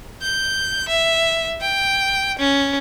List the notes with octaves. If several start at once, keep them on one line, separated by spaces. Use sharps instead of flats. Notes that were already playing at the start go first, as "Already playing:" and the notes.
G6
E5
G5
C#4